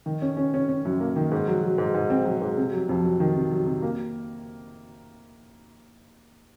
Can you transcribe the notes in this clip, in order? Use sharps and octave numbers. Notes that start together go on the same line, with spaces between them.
D#3
C#4
C#4
C#4
C#4
F#2
A#3
D#3
G#2
F#3
F#3
G#2
G#2
C4
F#3
G#2
C3
F#3
F2
F#3
D#3
C3
F#3
C3
A#3